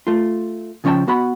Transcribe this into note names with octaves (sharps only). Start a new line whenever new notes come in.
A3 F4
C#3 F3 C#4 C#5 G5 A5
B3 F#4 F#5 B5